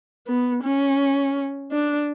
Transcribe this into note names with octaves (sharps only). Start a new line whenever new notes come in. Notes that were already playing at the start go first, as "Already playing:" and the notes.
B3
C#4
D4